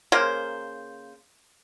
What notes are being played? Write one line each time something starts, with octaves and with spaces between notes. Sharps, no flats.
C#3 A#3 A#4 C5